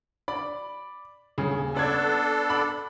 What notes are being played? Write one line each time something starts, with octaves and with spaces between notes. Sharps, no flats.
D5 B5
D#1 C#3 G#4
B3 C#4 D4 A4 D5 G#6
B5 D6